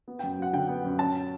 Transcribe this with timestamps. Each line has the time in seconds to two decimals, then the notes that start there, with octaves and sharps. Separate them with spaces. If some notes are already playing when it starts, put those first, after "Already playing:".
0.08 B3
0.19 G5
0.23 F#2
0.39 F#3 F#5
0.53 D3 G5
0.69 B3
0.84 F#2
0.99 C#4 A5